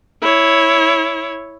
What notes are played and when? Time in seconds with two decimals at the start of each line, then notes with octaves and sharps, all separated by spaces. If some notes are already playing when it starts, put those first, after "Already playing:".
0.22 E4 C#5